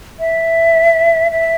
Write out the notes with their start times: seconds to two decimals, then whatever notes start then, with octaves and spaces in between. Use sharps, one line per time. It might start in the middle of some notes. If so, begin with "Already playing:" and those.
0.19 E5
1.31 E5